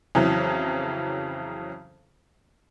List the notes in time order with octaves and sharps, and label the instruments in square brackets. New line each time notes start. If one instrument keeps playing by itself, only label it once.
[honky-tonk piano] F2 C#3 E3 F#3